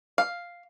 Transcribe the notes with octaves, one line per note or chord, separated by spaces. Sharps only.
F5